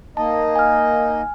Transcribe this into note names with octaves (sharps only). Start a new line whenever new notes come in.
A#3 D#4 D#5 A5
G#5 F6